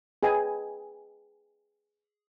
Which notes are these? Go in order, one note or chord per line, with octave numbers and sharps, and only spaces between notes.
G#4 B4 D#5 G5 G#5